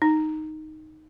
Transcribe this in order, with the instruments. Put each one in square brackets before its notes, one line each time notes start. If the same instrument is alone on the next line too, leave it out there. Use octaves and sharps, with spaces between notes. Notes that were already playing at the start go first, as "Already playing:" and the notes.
[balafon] D#4